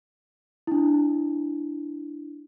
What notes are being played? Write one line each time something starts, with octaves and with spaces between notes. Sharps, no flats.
D4 E4